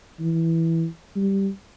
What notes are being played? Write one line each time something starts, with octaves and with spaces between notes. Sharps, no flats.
E3
G3